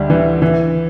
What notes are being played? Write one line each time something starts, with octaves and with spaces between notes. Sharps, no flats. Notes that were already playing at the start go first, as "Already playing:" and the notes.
Already playing: D2 G3
E3
E3